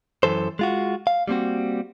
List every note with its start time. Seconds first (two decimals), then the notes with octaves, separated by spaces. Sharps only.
0.23 F#2 D#3 E3 A4 C5
0.59 G#3 F4 F#4
1.07 F5
1.28 G3 A#3 C4 F#4